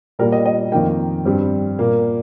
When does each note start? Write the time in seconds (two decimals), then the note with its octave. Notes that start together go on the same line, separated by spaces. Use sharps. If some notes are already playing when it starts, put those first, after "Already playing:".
0.19 A#2 G3 A#3 A#4
0.32 D#5
0.46 D#5
0.72 F2 D#3 A#3 G5
1.25 G2 G3 C4
1.79 A#2 A#3